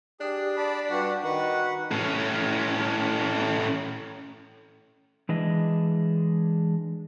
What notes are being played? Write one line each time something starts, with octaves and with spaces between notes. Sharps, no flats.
D4 G4 G#4
D5 A5 B5
G2 F#4 G4 F#5
D#3 F#4 B4 F#5
A2 C#4
E3 G#3 D4 D#5